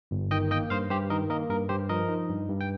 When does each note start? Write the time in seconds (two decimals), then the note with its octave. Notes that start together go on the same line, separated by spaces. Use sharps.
0.11 G1
0.31 D#3 D#5 G5
0.51 A#3 D#5 G5
0.70 G2 C5 F5
0.90 G2 G4 C5
1.10 D#3 A#4 D#5
1.30 A#3 A#4 D#5
1.50 G2 A#4
1.69 G2 G4 C5
1.89 F3 A#4 D#5
2.09 D#4
2.29 G2
2.49 G2
2.61 G5